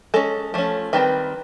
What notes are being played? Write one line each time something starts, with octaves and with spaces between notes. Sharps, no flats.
G#3 C#4 A4
F3 A3 C#4
D#3 G3 C4 B4